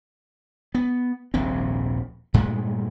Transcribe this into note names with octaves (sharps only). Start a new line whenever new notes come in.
B3
D#1 A#1 G#2 C4
G2 A#2 G#3 A3